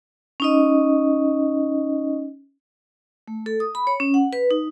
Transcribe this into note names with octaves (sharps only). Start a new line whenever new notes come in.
C#4 D#4 D#5
A3
A4
D#6
B5
C#5
C#4
F#5
B4
D#4